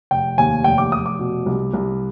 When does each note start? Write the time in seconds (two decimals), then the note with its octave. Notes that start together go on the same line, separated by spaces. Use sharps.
0.11 F1 G5
0.38 D#2 G#5
0.64 F1 G5
0.78 D6
0.91 F1 D#6
1.06 D6
1.19 B2
1.46 C2
1.74 C2